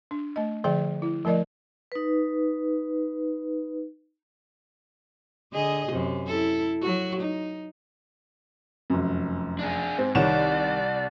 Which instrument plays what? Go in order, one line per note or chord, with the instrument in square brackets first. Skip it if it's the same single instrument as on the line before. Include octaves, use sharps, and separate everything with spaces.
[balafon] D4
A3 D#5
D3 F3 G#4 D5 G5
E4
F3 A3 A#4 D5 D#5
[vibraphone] D#4 B4
[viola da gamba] D3 G#4 D#5
F#2 C3
E4 A4
F#3 F#4
D#4
[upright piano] F1 F#2
[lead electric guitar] D4 G#4
[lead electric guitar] G#2 [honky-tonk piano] C4
[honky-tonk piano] C2 [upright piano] D#3 C#5 E7 [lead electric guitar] D5